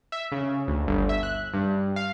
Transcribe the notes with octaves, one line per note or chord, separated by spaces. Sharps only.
E5
C#3
D2
G1
E5
F#6
G2
F5